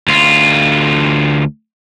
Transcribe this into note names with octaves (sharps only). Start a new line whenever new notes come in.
D2 F4